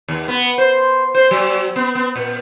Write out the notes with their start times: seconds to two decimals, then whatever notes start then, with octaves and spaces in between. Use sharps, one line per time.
0.08 D#2
0.28 B3
0.58 C5
1.15 C5
1.31 F#3
1.76 B3
1.95 B3
2.16 A#2